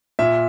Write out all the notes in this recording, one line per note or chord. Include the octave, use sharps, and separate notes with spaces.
A#2 E5